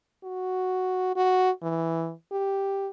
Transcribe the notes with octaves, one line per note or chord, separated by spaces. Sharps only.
F#4
F#4
E3
G4